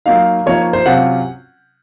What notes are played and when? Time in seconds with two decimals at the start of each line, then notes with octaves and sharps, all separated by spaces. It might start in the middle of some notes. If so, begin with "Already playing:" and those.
0.06 F#3 A#3 D#4 F5
0.46 F3 A#3 D#4 C#5
0.73 C5
0.86 C3 F#3 C#4 F4 F#5